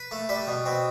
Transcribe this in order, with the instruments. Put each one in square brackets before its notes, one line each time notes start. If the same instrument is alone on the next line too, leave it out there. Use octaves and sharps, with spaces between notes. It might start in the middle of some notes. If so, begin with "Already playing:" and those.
Already playing: [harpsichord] B4
A3
G3 B4
B2
B2 C4